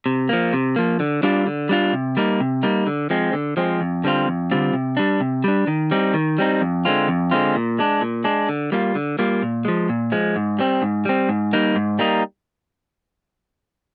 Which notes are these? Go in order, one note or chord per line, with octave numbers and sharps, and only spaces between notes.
C3
F3 A#3
C3
F3 A#3
D3
G3 D4 F4
D3
G3 D4 F4
C3
G3 A#3 D#4
C3
G3 A#3 D#4
D3
F3 G#3 C4
D3
F3 G#3 C4
F2
D3 G3 C4 F4
F2
D3 G3 C4 F4
C3
G3 D4
C3
G3 D4
D#3
G3 C4 D#4
D#3
G3 C4 D#4
F2
D3 G#3 C4 F4
F2
D3 G#3 C4 F4
A#2
G#3 D4
A#2
G#3 D4
D3
G3 A#3 F4
D3
G3 A#3 F4
A#2
F3 G#3
A#2
F3 G#3
G#2
G3 C4
G#2
G3 C4
G#2
G3 A#3 D#4
G#2
G3 A#3 D#4